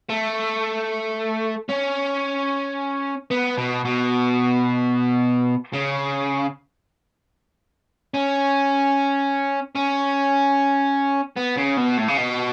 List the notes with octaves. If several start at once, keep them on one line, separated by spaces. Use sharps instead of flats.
A3
C#4
B3
B2
B2
C#3
C#4
C#4
B3
C#3
B2
A2
C#3
B2